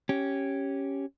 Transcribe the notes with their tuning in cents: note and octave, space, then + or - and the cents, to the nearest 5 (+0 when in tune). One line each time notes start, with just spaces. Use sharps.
C#4 -5 G4 -10